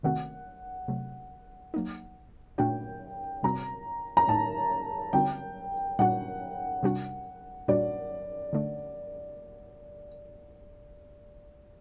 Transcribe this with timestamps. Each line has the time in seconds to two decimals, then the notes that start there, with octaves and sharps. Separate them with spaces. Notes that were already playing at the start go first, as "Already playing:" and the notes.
0.03 C3 D#3 A3 C4 F#4 F#5
0.88 C3 F#3 A3
1.74 F#3 A#3 D#4
2.58 A#2 A3 D4 F#4 G5
3.43 C3 G3 C4 F#4 A#5
4.17 A#5
4.28 A2 A3 D#4 A5
5.13 D3 G3 C4 D#4 F#4 G5
5.99 A#2 G3 D4 F#4 F#5
6.83 C3 G3 D4 F#4
7.68 A#2 G3 D4 F#4 D5
8.53 D3 A3 D4